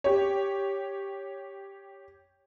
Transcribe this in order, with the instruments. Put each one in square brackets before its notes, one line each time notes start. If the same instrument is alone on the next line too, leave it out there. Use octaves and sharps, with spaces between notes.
[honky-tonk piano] G4 C#5